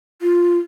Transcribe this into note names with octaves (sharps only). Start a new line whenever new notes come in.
F4